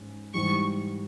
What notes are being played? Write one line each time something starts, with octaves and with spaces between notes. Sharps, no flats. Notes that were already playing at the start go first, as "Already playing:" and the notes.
Already playing: G#2 C#4
G#2 E3 G3 C#6